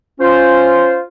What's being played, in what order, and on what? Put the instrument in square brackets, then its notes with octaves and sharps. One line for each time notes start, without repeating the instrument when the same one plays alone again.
[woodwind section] C#4 F4 C5